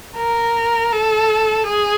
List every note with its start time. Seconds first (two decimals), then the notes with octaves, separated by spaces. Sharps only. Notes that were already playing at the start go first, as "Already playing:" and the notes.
0.17 A#4
0.92 A4
1.67 G#4